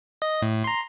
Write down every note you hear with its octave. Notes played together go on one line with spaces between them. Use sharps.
D#5
A2
A#5 C6